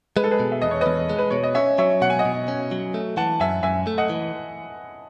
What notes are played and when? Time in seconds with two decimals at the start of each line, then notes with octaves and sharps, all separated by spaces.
0.16 G#3 B4
0.24 A4
0.31 G#4 B4
0.40 B2
0.52 E5
0.62 E2 D#5
0.71 C#5
0.81 E2 B4 D#5
1.09 G#3
1.19 B4
1.30 B2 C#5
1.43 D#5
1.55 C#4 C#5 E5
1.78 F#3 C#5 E5
2.01 B2 F#5
2.10 G#5
2.19 D#5 F#5
2.25 B2
2.48 C#4
2.71 F#3
2.94 A3
3.17 E3 F#5 A5
3.40 F#2 E5 G#5
3.63 F#2 E5 G#5
3.87 A3
3.98 D#5 F#5
4.10 E3